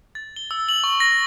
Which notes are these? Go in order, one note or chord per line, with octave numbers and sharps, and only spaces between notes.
A6
G7
E6
F#7
C#6
A#6